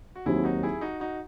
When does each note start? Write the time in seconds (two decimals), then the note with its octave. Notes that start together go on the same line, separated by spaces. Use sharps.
0.15 F#4
0.26 D#2 D#3 F#3 C4 E4 G#4
0.44 D#4 F#4
0.63 E4 G#4
0.81 D#4 F#4
1.00 D#4 F#4